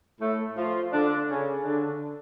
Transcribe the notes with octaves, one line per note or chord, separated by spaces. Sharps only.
A2 A3
F3 F4
D3 D4
C#3 C#4
D3 D4